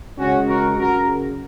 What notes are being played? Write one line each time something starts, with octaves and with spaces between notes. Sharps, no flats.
C#3 G#3 C#4 F#4
F#4 A#4
C#3 F#3 F#4 A#4